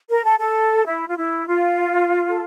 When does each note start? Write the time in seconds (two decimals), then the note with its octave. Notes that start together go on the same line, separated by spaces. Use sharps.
0.09 A#4
0.24 A4
0.40 A4
0.86 E4
1.08 F4
1.17 E4
1.48 F4
2.30 A4